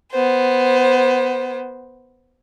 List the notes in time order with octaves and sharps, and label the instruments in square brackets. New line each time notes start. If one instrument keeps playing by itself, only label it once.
[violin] B3 C5